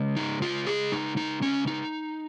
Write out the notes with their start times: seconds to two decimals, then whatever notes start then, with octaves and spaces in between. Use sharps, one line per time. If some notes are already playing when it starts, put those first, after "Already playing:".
Already playing: C#3 G#3
0.16 D#4
0.42 F4
0.66 G#4
0.92 D#4
1.17 D#4
1.42 C#4
1.67 D#4